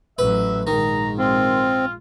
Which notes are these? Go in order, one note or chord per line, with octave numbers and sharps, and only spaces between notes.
A1 F#3 B4 E5
A#1 G#2 D#3 A#5
C4 F4